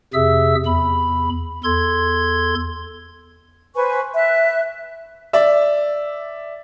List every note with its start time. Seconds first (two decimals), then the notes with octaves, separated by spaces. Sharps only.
0.14 F2 C3 G#4 E5 E6
0.66 E2 B5
1.64 E2 A4 C6 G#6
3.75 B4 C5 G#5 C#6
4.14 E5 F#6
5.33 D5 E5